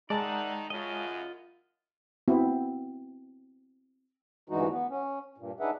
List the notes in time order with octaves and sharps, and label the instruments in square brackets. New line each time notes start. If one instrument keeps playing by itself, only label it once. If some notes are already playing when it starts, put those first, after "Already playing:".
[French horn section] D#3 D#4 [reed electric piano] G#3 A5 A6 [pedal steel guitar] D5 E5 F#5
[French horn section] F#2 C#3 [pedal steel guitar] F4 D#5
[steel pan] B3 C4 E4 F#4
[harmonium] D2 G2 E3 G#3 D#4 F#4
B3
C#4
G2 A#2
D4 D#4 G#4 B4 E5 F#5